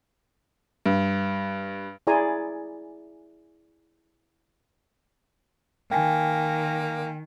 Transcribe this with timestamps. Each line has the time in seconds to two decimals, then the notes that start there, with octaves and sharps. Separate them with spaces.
0.86 G2
2.07 E4 G#4 D5 G#5 A#5 C6
5.91 D#3 A#3 G5 G#5